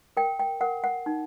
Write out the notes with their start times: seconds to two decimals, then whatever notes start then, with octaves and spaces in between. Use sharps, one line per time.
0.17 A#4 G5
0.39 G5
0.61 A#4 F#5
0.84 F#5
1.06 D#4